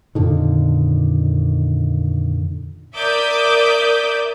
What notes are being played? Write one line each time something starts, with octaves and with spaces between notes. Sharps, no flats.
F2 A#2 D3 D#3
A#4 D5 E5 D6 D#6 G6